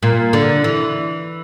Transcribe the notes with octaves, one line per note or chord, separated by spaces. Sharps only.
A#2
D3
E3